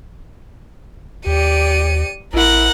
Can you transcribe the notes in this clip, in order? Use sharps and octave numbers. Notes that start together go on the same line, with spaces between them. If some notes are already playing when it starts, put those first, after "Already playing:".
D#2 G4 D5 C#7 D#7
A1 E4 A#4 F#5